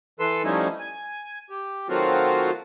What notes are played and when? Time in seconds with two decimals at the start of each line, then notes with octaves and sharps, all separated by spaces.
0.20 E3 A4 B4 C6 E6
0.44 F3 G3 A3 C#4 D#4 E4
0.79 G#5
1.50 G4
1.89 D#3 F#3 A3 C4 F4 F#4